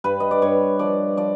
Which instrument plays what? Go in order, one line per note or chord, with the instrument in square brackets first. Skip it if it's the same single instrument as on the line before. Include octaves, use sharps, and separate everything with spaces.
[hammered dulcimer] G2 B4
D#5
D5
G2 C#5
F3 D5
F3 D5